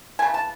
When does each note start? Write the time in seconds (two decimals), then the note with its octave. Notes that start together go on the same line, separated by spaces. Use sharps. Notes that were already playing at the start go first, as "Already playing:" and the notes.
0.19 C#3 E3 A3 G#5
0.34 A5